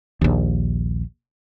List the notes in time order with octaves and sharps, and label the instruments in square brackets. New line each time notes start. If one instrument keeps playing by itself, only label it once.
[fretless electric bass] A#1 D#2